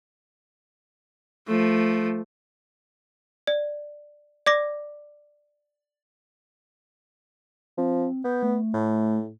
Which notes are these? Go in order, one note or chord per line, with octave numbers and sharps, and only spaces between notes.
F3 A3
D5
D5 D6 A#6
F3 C4
B3 G6
A3
A2